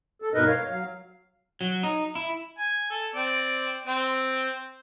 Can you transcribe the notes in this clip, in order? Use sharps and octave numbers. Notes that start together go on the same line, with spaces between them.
A4
G2 B2 D#4 A#4 B4 D#5
C#5 F5
F#3 F5
F#3
D#4
E4
G#5
A4
C4 D5
C4